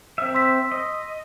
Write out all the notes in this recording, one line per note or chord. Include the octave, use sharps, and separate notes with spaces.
C4 E5
C6 E6 B6
D#5